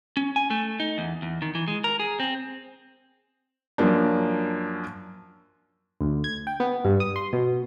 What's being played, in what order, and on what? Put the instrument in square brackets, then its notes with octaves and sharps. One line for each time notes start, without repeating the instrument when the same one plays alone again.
[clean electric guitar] C#4
G#5
A3
D#4
E2
E2
D#3
E3
G#3
A#4
G#4
C4
[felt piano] F#2 F3 A#3 D4
[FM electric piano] D2
G#6
G5
B3
G2
D#6
C6
B2